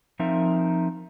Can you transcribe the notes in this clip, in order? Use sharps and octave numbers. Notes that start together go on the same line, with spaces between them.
F3 C4 D#4 A#4 E5